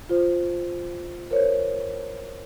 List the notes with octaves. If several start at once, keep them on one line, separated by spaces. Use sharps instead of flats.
F4 C5
A#4 C5 C#5